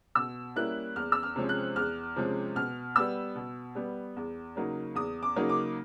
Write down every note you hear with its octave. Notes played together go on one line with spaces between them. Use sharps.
B2 E6
G3 A#3 C#4 E4 F#6
E2 F6
E6
F6
C3 F3 G#3 C#4
F#6
E2 F6
C3 F3 G#3 C#4
B2 F6
G3 B3 E6
B2
G3 B3
E2
C#3 F#3 A#3 D#4
E2 D#6
D6
C#3 F#3 A#3 D#4
D6